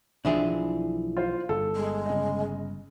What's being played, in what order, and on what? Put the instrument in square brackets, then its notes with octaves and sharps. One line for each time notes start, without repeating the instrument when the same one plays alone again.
[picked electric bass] B1 E3 F3 [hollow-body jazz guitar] D4 E4 G#4
[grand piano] F4 C5
[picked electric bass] G1 [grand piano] A4
[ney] G#3
[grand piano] C#3 D#5